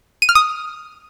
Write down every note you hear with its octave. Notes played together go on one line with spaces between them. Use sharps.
D#7
F6
D#6